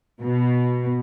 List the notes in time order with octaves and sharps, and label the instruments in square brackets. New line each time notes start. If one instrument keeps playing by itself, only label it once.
[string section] B2